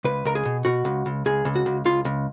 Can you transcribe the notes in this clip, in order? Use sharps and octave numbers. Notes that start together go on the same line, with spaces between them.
C#2 B4
C#2 A#4
G#4
B2
B2 F#4
C#2
C#2
C#2 G#4
C#2
F#4
C#2
C#2 F4
C#2